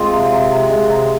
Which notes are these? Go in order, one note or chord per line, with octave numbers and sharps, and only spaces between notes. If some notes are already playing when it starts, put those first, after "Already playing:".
Already playing: G#3 C4 F4
C3
C3
C3
G#3
C3